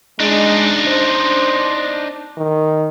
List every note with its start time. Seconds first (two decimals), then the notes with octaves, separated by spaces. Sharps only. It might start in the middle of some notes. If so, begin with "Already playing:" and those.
0.20 G#3 D4 D#4
0.88 C5
2.38 D#3